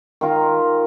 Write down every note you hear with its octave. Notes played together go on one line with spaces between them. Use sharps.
D#3 F4 A#5